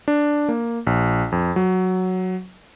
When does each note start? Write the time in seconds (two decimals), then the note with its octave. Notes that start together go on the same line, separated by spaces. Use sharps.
0.08 D4
0.48 A#3
0.87 A#1
1.32 F2
1.56 F#3